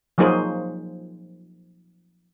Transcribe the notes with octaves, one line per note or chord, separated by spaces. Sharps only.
F3 F#3 A#3 D#4 G#4 C5